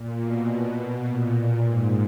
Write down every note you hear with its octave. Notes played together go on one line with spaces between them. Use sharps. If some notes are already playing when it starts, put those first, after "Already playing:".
Already playing: A#2
B2
A#2
G#2